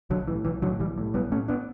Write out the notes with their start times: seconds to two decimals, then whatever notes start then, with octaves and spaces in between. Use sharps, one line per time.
0.10 B1 D3 F#3
0.28 A2 E3
0.45 B1 E3
0.62 A2 D3 F#3
0.80 B1 E3 G3
0.98 A2
1.14 B1 G3 B3
1.31 A2 A3 C#4
1.48 B3 D4